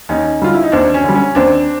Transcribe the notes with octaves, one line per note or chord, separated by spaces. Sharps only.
D#2 C#4 D#4
D3 G3 F4
E4
D#4
D#2 C4 D4
C#4
D3 G3
C#4
D#2 C4 D4